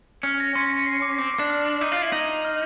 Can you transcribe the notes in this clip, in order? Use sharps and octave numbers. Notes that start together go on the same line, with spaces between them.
C#4 F6
A#6
C#4 C6
C#7
C7
D6
C4 D6
D6
D4
F6
D6
D#4 D6
F4 A6
E4
D#4 F#7
F#7
F6